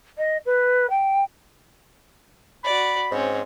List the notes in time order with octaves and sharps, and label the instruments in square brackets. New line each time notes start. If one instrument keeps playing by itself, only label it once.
[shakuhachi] D#5
B4
G5
[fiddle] F#4 D5 [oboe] B5
[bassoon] G#2 [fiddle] C4 C#4